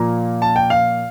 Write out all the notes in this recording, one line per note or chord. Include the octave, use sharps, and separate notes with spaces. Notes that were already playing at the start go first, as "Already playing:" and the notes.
Already playing: A#2 F3 A#3 A#5
A5
G5
F5